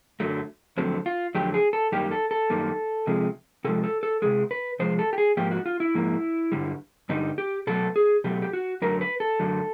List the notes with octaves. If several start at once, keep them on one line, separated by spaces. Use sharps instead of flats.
F#2 D3 F#3 A3
F2 D3 F#3 A3 C4
F4
F2 D3 F#3 A3 G4
G#4
A4
F#2 D#3 G3 A#3 G4
A4
A4
F#2 D#3 G3 A#3
C3 F3 G#3
C3 F3 G#3 A4
A4
A4
C3 F3 G#3 G#4
B4
C3 F3 G#3 C5
A4
G4
G#4
G#2 F3 A#3 G4
F#4
F4
E4
G#2 F3 A#3
G2 D3 G3
G2 D3 G3 D#4
G4
B2 F#3 A3 A4
G#4
B2 F#3 A3 G4
G4
F#4
F#2 D3 F#3 A3 A#4
B4
A4
F#2 D3 F#3 A3